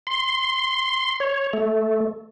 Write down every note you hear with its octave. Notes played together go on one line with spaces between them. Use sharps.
C6
C#5
A3